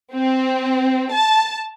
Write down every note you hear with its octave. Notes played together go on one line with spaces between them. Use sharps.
C4
A5